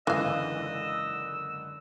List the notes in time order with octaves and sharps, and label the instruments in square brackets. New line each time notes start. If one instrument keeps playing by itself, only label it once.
[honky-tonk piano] F#1 G#2 D3 [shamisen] E3 F5 [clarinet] D#5 [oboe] E6